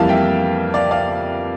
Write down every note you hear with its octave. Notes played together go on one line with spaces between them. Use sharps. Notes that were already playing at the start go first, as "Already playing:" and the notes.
Already playing: F2 E3 G3 A#3 F5 A5
E5 G5
D5 F5
D5 F5